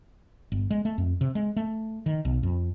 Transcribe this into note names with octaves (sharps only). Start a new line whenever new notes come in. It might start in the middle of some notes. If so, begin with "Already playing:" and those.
G1
G#3
A3
F2
C3
G#3
A3
D#3
B1
F2